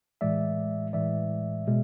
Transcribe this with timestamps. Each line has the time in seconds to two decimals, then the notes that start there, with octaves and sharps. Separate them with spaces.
0.21 A2 E3 G#3 D5 E5
0.93 A2 E3 G#3 D5 E5
1.67 B2 G#3